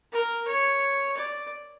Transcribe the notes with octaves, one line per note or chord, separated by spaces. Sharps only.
A#4
C#5
D5